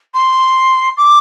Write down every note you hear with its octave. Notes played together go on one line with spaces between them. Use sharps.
C6
D6